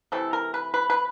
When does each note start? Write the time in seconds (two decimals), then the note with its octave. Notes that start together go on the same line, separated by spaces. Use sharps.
0.12 C3 E3 A3 A4
0.33 A#4
0.54 B4
0.74 B4
0.90 B4